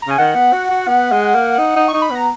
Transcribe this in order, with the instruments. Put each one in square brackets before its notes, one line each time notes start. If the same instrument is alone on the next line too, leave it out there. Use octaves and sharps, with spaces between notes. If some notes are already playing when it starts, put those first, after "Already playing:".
[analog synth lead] A#5
[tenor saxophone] C#3 [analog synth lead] G#5
[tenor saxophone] D#3 [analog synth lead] F#5
[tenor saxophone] B3
F#4
F#4
B3
G#3
A#3
D#4
D#4
[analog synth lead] C#6
[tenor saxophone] D#4
[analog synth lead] B5
[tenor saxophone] B3 [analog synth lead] A#5